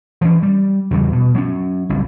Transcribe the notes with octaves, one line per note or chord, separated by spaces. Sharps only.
E3 C#4
G3
E2 C#3 G3
B2
F#3 C#4
F#1 C2